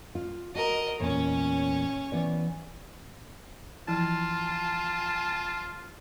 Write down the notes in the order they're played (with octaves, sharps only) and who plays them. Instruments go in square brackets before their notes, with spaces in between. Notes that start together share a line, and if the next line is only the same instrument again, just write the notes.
[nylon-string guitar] F4
[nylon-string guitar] F#4 [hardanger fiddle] A#4 D#5
[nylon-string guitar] E2 A#2 [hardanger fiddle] C#4 C#5
[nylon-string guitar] E3 B3 D5
[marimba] E3 F3 E4 [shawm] F4 [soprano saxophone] A5